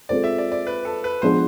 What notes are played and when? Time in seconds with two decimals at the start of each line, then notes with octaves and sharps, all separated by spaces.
0.09 G#3 C4 F4 A4 C5 D5
0.24 E5
0.38 D5
0.52 D5
0.67 B4
0.85 A4
1.04 B4
1.22 F3 G#3 B3 D4 G#4 C5